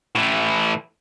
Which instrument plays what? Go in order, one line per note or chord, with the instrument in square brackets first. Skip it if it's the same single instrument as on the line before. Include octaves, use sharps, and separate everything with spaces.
[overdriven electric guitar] A2 E3